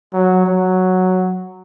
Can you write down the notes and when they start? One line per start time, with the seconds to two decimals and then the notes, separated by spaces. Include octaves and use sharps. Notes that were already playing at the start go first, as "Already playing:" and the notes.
0.13 F#3
0.46 F#3